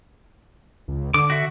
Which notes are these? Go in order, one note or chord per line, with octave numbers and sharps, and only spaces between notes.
C#2
D3 D6
F#4 E5